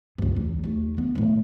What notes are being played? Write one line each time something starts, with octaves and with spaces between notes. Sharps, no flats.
C#2 G2
E2
D#2 A3
D3 B3
A2 D#3